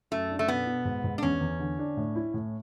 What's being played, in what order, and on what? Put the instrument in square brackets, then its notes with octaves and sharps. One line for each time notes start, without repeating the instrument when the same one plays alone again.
[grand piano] F#2 [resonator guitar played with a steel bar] A3
[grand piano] D4
[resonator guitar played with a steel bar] A3
[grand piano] B2 [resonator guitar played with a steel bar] B3
[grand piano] B2
G#2
G#2
[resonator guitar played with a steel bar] D4
[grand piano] E2 [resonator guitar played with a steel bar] C#4
[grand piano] E2
D3
D4
A2
E4
A2